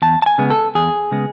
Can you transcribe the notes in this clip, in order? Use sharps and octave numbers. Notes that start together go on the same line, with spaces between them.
E2 A5
A5
G#5
C#3 G#3 B3
A4
E2 G#4
C#3 G#3 B3